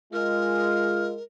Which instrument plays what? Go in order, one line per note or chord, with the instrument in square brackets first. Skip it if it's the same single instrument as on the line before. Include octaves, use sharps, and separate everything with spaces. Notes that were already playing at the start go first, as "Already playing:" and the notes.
[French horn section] G#3 [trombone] F4 [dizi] A#4 [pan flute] F6